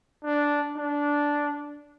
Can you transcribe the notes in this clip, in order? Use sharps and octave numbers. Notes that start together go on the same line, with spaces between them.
D4
D4